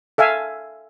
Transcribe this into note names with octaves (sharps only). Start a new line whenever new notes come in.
A4 E5 F5 G#5